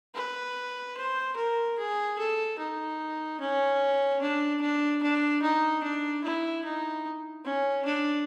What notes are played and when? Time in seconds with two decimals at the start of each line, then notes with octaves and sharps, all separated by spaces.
0.15 B4
0.97 C5
1.36 A#4
1.78 G#4
2.18 A4
2.58 D#4
3.40 C#4
4.21 D4
4.61 D4
5.02 D4
5.42 D#4
5.83 D4
6.24 E4
6.65 D#4
7.45 C#4
7.85 D4